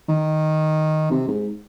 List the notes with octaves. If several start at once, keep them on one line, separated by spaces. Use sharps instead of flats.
D#3
C3
G#2